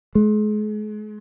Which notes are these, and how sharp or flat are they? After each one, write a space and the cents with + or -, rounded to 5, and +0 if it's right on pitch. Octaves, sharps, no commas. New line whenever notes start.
G#3 +35